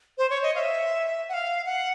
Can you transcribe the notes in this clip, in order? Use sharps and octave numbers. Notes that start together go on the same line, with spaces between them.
C5
C#5
D#5
F5
E5
F#5
F5
F#5